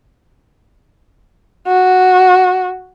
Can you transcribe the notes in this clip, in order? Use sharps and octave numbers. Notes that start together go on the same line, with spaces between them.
F#4